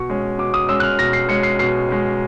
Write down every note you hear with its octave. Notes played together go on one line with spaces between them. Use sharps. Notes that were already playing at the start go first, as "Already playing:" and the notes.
Already playing: B2 C#6
G#3 C#4
B2 D6
D#6
G#3 C#4 E6
F#6
F6
B2 A#6
C7
G#3 C#4 C#7
C7
B2 C7
G#3 C#4